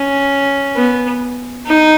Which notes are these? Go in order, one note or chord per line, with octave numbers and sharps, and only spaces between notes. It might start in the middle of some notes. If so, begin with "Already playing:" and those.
Already playing: C#4
B3
D#4